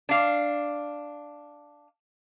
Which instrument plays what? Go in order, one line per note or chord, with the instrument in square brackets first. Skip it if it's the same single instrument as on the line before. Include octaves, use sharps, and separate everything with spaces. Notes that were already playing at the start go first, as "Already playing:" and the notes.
[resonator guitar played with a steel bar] D4 F5